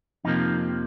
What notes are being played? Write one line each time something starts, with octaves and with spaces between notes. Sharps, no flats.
F2 C3 F3 A#3 D#4